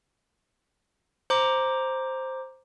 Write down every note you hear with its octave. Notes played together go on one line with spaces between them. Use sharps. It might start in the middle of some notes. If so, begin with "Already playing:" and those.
C5 A#5 D6